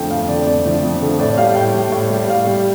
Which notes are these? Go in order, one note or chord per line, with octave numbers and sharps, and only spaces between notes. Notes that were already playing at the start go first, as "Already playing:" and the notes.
Already playing: F2 D3 F3 A3 G5
F2 F5
D3 F3 A3 D5
F2 D5
D3 F3 A3
F2
D3 F3 A3
A2 D5
G3 F5
A2 G5
G3
A2
G3
A2 F5
G3